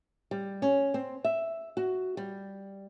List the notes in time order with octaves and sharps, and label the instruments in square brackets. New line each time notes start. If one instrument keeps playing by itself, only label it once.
[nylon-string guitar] G3
C#4
C4
E5
F#4
G3